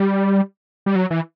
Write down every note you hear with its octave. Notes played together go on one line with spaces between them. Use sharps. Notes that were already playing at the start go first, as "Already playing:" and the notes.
Already playing: G3
G3
F#3
E3